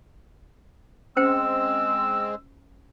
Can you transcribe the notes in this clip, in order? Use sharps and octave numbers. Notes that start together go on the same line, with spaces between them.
G#3 C4 C#4 C5 G5 E6